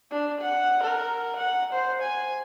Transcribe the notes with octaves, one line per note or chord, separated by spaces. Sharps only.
D4
F#5
A#4
F#5
C5
G#5